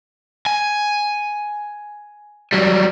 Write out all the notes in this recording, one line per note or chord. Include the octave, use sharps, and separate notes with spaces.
G#5
F#3 G3